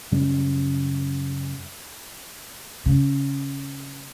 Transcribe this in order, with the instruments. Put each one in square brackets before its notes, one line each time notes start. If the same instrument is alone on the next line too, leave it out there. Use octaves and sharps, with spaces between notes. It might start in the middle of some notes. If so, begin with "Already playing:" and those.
[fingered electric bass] F#2 C#3 G3 C#4
[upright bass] C#3